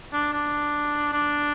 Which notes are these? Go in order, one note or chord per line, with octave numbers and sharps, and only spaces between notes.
D4
D4
D4